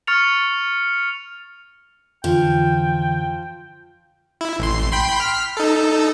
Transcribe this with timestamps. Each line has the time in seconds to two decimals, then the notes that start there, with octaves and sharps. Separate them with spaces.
0.07 C#6 F6 A6 C#7 F7
2.24 F2 D3 E3 F3 G5
4.41 E4
4.59 A1 C6
4.92 G5 B5 C6
5.20 F6 B6
5.57 D#4 A4